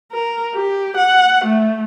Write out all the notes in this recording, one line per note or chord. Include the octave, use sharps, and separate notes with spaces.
A#4
G4
F#5
A3